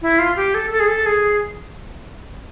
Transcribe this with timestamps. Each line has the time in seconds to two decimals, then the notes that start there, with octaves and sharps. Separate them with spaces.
0.02 E4
0.19 F4
0.36 G4
0.54 A4
0.71 A4
0.80 G#4
0.88 A4
1.06 G#4